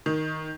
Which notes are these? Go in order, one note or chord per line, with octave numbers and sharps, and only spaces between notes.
D#3